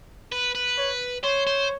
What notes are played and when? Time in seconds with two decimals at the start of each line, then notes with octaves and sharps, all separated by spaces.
0.32 B4
0.55 B4
0.78 C#5
1.24 C5 C#5
1.47 C5